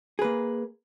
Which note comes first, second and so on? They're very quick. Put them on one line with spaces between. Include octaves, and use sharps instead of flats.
G#4 B4 A#3